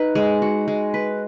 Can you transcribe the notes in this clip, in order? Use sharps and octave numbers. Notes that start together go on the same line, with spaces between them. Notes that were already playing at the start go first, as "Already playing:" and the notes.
Already playing: D#4 B4
G#3
F#4
G#3
B4